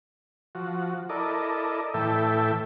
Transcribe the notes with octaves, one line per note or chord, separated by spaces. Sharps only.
F3 F#4
E4 A4 A#4 D5 D#5
A2 E3 A4 E5 G5